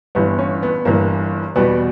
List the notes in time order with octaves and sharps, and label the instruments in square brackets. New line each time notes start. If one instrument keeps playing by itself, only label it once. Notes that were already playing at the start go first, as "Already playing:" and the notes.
[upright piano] G1 G2 E3 B3
C#4
B3
G1 G2 E3 A#3
E2 B2 G3 B3